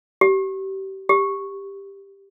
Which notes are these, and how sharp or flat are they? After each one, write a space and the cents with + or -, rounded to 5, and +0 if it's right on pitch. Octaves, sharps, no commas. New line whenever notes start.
G4 -30
G4 +10